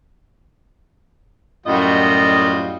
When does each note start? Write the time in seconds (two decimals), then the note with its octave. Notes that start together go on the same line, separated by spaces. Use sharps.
1.66 F#2 A2 G3 F4 F#4 D#5